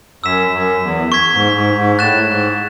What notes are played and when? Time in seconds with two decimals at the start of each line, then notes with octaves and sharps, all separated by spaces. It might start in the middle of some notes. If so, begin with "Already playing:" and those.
0.24 F#2 E6 B6 E7
0.53 F#2
0.83 E2
1.12 C#6 G#6 B6
1.33 G#2
1.55 G#2
1.77 G#2
1.99 A2 F#6 A6 E7
2.28 G#2